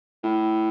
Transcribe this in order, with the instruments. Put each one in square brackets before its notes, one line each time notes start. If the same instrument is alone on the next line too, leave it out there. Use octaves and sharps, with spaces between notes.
[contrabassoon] A2